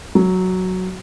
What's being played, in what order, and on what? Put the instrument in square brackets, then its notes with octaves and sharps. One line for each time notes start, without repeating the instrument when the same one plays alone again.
[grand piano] F#3